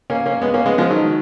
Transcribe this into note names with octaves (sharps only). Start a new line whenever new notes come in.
A#3 C#4
A#3 C#4
G#3 B3
A#3 C#4
G#3 B3
F3 G#3
D#3 F#3